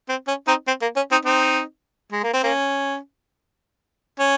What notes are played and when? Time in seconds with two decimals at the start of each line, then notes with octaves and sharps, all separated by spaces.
0.09 C4
0.28 C#4
0.48 C4 D#4
0.67 C4
0.82 A#3
0.96 C#4
1.11 C4 D#4
1.25 C4 D#4
2.12 G#3
2.23 A#3
2.34 C4
2.43 A#3 C#4
4.19 C#4